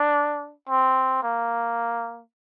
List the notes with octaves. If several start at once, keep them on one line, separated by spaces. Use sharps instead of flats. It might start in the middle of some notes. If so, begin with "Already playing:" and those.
Already playing: D4
C4
A#3